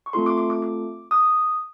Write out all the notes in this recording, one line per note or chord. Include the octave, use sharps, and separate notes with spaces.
C#6
A3 C4 F4 A4 C6
D6
D6
D6
D6
D#6